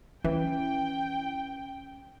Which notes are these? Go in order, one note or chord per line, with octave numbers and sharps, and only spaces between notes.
E3 C#4 G5